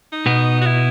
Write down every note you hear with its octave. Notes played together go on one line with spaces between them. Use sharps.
D#4
B2 B3
F#4
E4